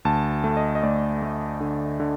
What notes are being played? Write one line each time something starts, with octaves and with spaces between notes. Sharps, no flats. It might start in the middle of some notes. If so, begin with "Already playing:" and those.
D2 A5
A3
D#5
D#5
D2 D5
A3
D3
D3